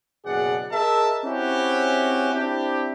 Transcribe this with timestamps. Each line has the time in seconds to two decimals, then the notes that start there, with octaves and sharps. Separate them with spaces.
0.26 F#1 B2 G#4 D5 F#5
0.72 G#4 A#4 D#5 E5 A5
1.24 C4 C#4 E4 F#4 G4
2.34 C4 D4 E4 G4